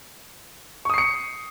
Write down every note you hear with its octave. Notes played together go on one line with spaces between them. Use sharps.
C#6 D#6 C7 C#7